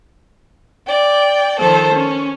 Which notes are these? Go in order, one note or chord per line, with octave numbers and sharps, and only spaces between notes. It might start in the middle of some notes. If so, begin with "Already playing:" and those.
D5 G5
D#3 F3 A4 C5
C#4